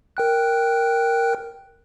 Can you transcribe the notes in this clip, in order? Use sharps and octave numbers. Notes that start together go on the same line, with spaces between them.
A#4 G5 F#6